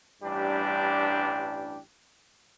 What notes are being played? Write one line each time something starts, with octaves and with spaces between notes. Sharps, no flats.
A1 G2 G3 D4 G4